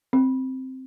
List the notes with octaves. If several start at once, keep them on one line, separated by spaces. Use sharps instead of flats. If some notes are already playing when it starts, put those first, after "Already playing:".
C4